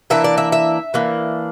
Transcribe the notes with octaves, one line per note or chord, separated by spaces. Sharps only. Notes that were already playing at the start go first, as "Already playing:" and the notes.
E3 A#3 D4 E5
D5
E5
E5
E3 A#3 D4